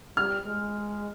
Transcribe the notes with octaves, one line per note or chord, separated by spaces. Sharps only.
G3 F6
G#3